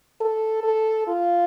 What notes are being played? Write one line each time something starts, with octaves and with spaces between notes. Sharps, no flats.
A4
A4
F4